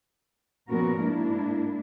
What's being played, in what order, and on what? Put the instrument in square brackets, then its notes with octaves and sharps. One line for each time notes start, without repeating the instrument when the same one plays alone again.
[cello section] A#2 F3 B3 C#4 F#4 A#4
G#2 A#3 D4 E4